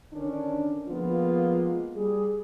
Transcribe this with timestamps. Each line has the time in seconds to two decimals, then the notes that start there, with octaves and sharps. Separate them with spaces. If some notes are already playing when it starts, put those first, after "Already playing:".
0.12 D3 D#3 C#4 D4
0.88 F3 G#3 A#3 B3 F4
1.95 G3 G#4